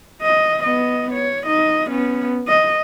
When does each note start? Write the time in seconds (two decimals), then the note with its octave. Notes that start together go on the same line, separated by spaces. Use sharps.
0.23 D#5
0.63 B3 D#5
1.13 C#5
1.46 D#4 D#5
1.89 B3 C#4
2.48 D#5